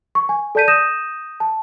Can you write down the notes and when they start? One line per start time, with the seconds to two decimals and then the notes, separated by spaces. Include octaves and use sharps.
0.15 C#6
0.29 G#5
0.55 A4 D5 A5 G6 B6 D#7
0.68 D#6 G6 A#6 D#7 E7
1.40 A5